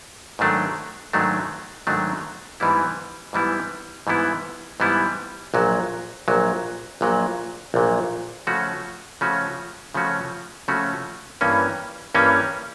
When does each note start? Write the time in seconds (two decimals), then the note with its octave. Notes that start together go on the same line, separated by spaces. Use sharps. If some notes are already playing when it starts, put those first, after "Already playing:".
0.39 G#2 D#3 F#3 A3 D4
1.13 G#2 D#3 F#3 A3 D4
1.87 G#2 D#3 F#3 A3 D4
2.60 G#2 E3 G3 B3 E4
3.33 G#2 E3 G3 B3 E4
4.07 G#2 E3 G3 B3 E4
4.80 G#2 E3 G3 B3 E4
5.54 A#1 A#2 F#3
6.28 A#1 A#2 F#3
7.01 A#1 A#2 F#3
7.74 A#1 A#2 F#3
8.47 C#3 F3 A3 C#4 F#4
9.21 C#3 F3 A3 C#4 F#4
9.94 C#3 F3 A3 C#4 F#4
10.68 C#3 F3 A3 C#4 F#4
11.41 G2 E3 G3 A#3 C#4
12.14 G2 E3 G3 A#3 C#4